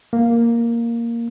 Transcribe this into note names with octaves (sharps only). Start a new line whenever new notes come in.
A#3